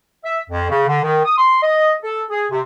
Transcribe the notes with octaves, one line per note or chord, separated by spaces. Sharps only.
E5
F2
C#3
D3
D#3
D#6
C6
D#5
A4
G#4
C3